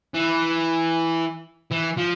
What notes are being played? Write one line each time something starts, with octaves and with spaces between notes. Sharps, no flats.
E3
E3
F3